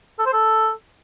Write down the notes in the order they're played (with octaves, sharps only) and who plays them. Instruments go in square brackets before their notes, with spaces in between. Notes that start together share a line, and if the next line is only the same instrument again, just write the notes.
[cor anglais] A4
C5
A4